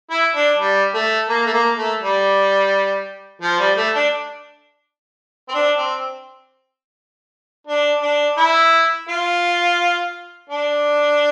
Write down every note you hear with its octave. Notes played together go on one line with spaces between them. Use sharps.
E4
D4
G3
A3
A#3
A3
A#3
A3
G3
F3
G3
A3
D4
C4
D4
C4
D4
D4
E4
F4
D4